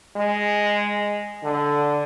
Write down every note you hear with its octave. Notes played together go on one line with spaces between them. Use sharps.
G#3
D3